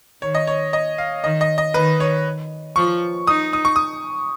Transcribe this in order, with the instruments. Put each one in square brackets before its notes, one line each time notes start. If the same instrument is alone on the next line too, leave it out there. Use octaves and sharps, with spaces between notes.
[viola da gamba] D#3 [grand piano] C#5
[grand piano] D#5
C#5
D#5
F5
[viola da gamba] D#3 [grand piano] D#5
[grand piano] D#5
D#5
[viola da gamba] D#3 [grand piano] B4
[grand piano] C#5
[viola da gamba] F3 [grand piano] C#6
[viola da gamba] D#4 [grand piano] D#6
[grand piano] D#6
C#6
D#6